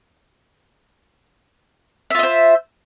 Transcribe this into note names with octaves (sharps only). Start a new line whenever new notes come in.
F4 C5 D#5 E5